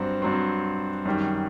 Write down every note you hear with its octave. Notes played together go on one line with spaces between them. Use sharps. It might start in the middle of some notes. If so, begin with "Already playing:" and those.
Already playing: G2 F#3 C4
G2 F#3 C4
F#2 D#3 G3